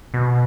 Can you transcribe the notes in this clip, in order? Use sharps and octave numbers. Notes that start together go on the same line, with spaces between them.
B2